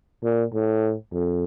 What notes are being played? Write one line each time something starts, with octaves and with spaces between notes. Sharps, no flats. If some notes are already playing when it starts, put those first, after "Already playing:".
A#2
A2
F2